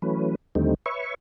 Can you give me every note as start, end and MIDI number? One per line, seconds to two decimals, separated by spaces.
0.02 0.35 52
0.02 0.35 54
0.02 0.35 57
0.02 0.35 61
0.02 0.35 71
0.55 0.74 39
0.55 0.74 50
0.55 0.74 55
0.55 0.74 57
0.55 0.74 60
0.55 0.74 63
0.86 1.14 71
0.86 1.14 73
0.86 1.14 76
0.86 1.14 85